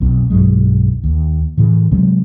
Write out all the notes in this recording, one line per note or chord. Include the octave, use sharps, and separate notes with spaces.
F1 B1 C4
B1 G2 F#3 G#3
D#2
A2 C#3 E3
C3 F#3 G#3 C4